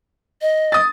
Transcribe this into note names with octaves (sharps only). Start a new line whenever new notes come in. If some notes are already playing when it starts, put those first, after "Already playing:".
D#5
D#6 A6